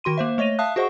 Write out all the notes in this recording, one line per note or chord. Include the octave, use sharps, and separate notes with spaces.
D#3 F#4 C6 D#7
A#3 C5 E5
A3 C#5 D#5 A#6 D#7 F7
E5 F5 A5 D#6 F#6
F#4 G#4 C5 D#5 F#5 C#6